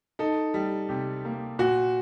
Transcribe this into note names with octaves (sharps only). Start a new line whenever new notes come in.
D#4 A4
G3
C3 G4
A#3
A#2 F#4